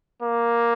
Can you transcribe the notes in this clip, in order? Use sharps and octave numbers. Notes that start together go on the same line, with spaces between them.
A#3